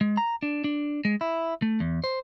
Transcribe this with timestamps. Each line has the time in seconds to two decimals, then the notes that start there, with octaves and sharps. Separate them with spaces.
0.01 G#3
0.17 A#5
0.43 D4
0.64 D4
1.05 G#3
1.21 E4
1.62 A3
1.80 E2
2.04 C5